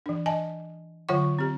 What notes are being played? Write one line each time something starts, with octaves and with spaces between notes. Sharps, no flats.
E3 D4
D#5 G#5 A5
D3 F#3 F4 C#5 F#5 C#6
C4 G4